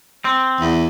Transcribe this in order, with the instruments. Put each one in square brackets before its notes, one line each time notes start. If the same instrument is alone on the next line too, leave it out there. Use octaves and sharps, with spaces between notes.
[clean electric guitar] C4
[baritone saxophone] E2